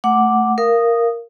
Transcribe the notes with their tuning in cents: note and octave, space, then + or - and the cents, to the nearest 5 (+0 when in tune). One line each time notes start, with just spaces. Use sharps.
A3 +0 F#5 +0 D6 +0
A#4 +0 F5 -20 D#6 -10